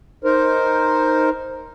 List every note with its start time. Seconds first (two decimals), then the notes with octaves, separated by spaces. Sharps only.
0.24 D#4 A#4 C5